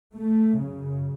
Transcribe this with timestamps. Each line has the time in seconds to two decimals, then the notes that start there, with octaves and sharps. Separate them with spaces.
0.15 A3
0.57 F#2 C#3